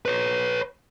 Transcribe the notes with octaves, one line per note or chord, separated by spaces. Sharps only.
B4 C#5